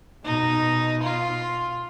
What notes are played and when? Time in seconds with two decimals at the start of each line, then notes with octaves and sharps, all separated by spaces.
0.25 B2 D#4
1.03 F4